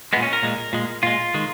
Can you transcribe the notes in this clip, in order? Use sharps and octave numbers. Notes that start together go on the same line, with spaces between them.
A#2 G#3 B3
C#4
A#4
A#2 G#3
A#2 G#3
A#2 G#3 F4
D#3 G#3